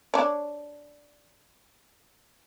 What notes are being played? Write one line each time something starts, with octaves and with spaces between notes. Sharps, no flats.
D4 C#5